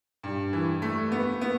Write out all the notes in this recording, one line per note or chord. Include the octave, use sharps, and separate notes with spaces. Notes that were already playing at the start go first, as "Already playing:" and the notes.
G2
E3
A3
B3
B3